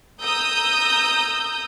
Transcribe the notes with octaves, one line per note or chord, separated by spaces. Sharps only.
A#5 D#6 E6 G6